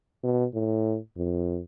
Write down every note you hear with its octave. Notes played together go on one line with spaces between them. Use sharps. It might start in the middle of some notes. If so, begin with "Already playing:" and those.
B2
A2
F2